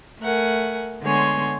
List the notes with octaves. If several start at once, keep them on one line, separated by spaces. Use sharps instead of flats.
A3 A#4 F#5 G#5
D3 G#3 B3 C#5 G#5 C6